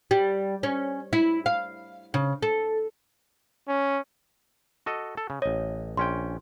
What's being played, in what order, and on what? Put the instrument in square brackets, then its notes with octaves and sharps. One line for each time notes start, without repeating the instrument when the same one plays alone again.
[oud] G3
C#4
E4
F5
C#3
A4
[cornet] C#4
[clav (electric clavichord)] F#4 A4 D#5
A4
C#3
[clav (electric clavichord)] A1 D#5 [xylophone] C#5
[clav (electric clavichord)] A#1 C#4 G5 [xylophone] C6